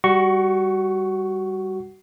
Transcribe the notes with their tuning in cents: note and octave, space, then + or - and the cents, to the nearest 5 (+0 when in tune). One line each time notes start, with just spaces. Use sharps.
G3 +0 F#4 +20 C#6 +0